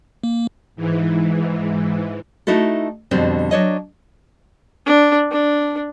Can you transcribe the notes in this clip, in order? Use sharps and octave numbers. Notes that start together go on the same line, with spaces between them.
A#3
G#2 E3
A3 D#4 E4 F#4 A4
F2 B2 D3 G3 C4
F#3 D4 C#5 D#5
D4
D4